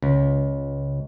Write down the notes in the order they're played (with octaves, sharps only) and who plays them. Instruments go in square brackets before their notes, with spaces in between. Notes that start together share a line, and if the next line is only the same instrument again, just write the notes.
[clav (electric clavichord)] C#2